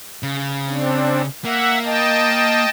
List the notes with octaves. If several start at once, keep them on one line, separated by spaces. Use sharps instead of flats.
C#3
C4 D4
A#3 E5 F#5
D#5 G5 A5